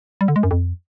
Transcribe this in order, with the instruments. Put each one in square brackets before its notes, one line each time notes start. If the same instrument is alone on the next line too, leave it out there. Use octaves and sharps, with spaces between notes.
[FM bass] G3
D3
G#3
F#2
F2